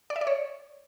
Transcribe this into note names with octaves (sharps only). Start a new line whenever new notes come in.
D5
E5
D5
C#5